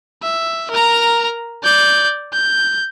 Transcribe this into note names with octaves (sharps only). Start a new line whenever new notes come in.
E5
A#4 A#5
D5 G6
G6